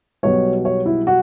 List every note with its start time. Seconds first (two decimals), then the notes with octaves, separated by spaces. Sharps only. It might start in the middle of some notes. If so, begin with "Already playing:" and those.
0.23 B1 B2 G3 C#5
0.65 C#5
0.86 E4
1.07 F#4